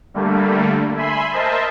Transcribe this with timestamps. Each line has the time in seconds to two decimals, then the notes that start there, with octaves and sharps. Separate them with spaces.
0.14 D3 G3 A3 A#3
0.95 E5 G#5 B5 C6
1.31 A#4 C5 D#5 E5 A5